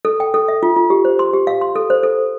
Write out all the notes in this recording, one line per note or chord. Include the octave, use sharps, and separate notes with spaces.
A4
G5
A4
E5
F4
F4
G4
C5
C6
G4
F5
C6
A4
C5
A4
A4